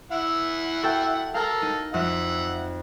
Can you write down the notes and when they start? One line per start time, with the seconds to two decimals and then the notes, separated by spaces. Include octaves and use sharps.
0.12 E4 E5 F#5
0.83 F#4 A4 G5
1.34 A4 A#4 F5 F6
1.62 D#4 A#6
1.94 F2 E5 F#5